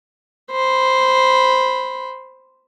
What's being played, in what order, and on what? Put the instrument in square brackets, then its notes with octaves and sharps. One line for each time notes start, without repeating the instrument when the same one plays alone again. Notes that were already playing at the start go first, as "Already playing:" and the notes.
[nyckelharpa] C5 B5